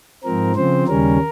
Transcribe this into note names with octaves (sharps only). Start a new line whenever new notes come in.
G#2 F3 C4 A#4
C#3 F3 C4 C5
D#2 C#3 G3 C#4 A#4